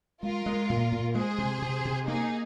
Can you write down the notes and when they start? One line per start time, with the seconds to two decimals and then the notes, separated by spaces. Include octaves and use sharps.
0.22 G#3 F4 A#4
0.46 G#3
0.70 A#2
0.92 A#2
1.15 G#3 G#4 C5
1.38 C3
1.62 C3
1.85 C3
2.08 A#3 D#4 G#4